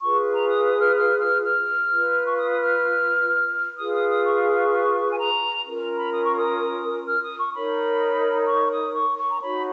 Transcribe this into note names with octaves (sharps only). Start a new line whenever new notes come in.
F4 G#4 B4 C#6
A#5
D#6
D#6
F6
F6
F6
F6
F4 B4
C#6
D#6
D#6
F6
F4 G#4 B4 D#6
D#6
D#6
C#6
G#5
A#5
C#4 F4 A#4
B5
D#6
C#6
D#6
F6
D#6
C#6
D#4 A#4 C#5 B5
C#6
D#6
C#6
C#6
A#5
D#4 F#4 C#5 B5